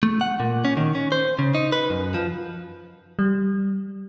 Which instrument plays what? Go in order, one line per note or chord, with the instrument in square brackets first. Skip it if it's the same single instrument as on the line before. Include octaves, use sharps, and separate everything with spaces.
[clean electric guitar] A3
F#5
A#2
C#4
D#3
C#4
C5
C#3
D#4
B4
F#2
F3
[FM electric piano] G3